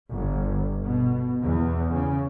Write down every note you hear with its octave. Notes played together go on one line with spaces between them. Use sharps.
G1
B2
E2
C#3